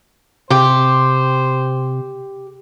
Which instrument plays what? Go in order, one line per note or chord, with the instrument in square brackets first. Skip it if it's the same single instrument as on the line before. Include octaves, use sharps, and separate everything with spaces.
[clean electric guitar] C3 [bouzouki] G4 [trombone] C5